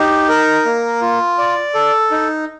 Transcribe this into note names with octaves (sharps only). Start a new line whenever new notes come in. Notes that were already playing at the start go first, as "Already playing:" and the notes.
Already playing: D#4 G4
A#4
A#3
F4
D5
A4
D#4